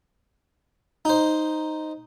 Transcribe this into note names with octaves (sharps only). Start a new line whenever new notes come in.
D#4 C5